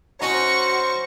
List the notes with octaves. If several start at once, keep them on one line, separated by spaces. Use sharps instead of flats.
C#4 D#4 F#4 C5 C#6